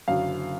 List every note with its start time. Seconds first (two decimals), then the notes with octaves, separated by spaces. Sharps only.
0.08 F#1 F#2 D3 F#3 F5